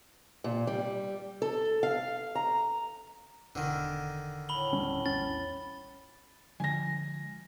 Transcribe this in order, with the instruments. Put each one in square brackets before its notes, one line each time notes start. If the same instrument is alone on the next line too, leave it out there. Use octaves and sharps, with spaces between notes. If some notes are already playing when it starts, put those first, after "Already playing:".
[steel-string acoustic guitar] A#2
G3
A4
F5
A#5
[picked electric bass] E1 [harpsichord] D3 D#3
[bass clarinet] A2 [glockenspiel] B5 F#7 G7
[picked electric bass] D#1 G3 C#4
[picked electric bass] A#1 E2 C#4 [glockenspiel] A6
[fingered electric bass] D3 F3 G#3 [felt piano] G#5 A#6